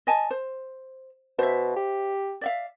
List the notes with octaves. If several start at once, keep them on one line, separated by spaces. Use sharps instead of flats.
D#5 G#5 A5
C5
B2 C5 E5
G4
D5 E5 F5